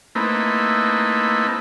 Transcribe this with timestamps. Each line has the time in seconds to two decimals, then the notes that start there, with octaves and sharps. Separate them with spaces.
0.15 A3 A#3 C4 D#4 E4 B4